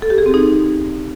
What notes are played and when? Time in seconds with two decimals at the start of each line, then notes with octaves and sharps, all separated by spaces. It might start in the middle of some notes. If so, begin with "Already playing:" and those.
0.02 A4
0.10 G4
0.18 G#4
0.26 C4
0.34 D#4